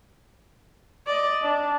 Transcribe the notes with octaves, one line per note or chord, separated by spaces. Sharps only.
D5 D#5
D4